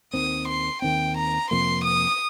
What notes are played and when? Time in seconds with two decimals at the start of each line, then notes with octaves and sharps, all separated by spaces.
0.13 D#2 D#3 C4 D#6
0.48 C6
0.82 D#2 D#3 C4 G5
1.17 A#5
1.51 F2 C3 F3 A#3 C6
1.84 D#6